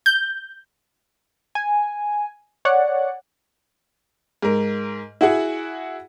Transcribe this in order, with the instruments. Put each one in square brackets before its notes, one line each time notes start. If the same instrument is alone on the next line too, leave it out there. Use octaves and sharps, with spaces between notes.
[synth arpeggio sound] G6
[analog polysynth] G#5
C#5 D5 F#5
[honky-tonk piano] G#2 A#4
E4 F#4 G#4 F#5